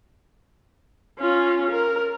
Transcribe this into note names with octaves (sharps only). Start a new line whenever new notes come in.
C#4 F4
A#4